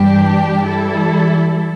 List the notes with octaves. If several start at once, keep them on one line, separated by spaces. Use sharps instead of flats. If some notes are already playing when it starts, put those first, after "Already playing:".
Already playing: G2 E3 G3 D4 G4
E3 G3 E4 A4